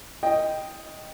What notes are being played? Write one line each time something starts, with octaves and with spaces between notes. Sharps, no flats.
D#5 G5